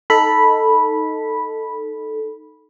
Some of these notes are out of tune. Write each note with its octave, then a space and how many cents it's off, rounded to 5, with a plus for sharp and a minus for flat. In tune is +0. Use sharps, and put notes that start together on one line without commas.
D#4 +0 A4 +0 B5 -10